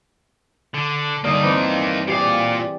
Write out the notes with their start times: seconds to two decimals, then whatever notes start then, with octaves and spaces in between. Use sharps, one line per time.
0.74 D3
1.24 G2 D3 A#3 D#4 D#6
1.43 E3 C4
2.08 A#2 G4 G#4 D5 F5